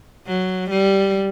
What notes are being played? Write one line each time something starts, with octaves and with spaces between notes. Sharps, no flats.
F#3
G3